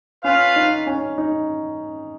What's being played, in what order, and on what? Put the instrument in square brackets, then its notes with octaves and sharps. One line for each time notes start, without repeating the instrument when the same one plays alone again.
[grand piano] C#4 [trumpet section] F4 B4 F5
[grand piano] D#4
C#4
D#4